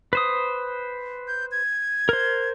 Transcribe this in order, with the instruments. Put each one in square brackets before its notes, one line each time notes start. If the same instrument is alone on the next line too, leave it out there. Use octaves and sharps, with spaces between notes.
[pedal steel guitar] B4 C5 D#6
[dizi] G6
G#6
[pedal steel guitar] A#4 C5